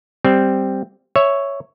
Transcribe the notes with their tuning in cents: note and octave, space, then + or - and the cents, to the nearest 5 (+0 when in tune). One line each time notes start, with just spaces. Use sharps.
G3 +0 C4 +0
C#5 +0 E5 +0